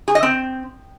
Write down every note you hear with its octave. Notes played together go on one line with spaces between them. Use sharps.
G#4
D#5
C4